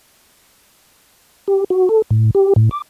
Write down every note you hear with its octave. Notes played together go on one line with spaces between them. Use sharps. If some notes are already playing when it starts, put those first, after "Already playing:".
G4
F#4
A4
A2
G4
A2
D6